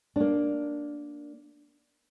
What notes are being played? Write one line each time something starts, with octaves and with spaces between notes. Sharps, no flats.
A#3 D4